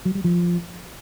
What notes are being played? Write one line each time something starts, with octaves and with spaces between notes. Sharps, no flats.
F#3
G3
F3